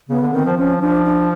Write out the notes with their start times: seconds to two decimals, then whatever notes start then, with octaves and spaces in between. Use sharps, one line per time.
0.09 C#3 B3
0.21 D3
0.33 D#3 C4
0.45 F3
0.57 F3 C#4
0.81 F3 D4
1.05 D4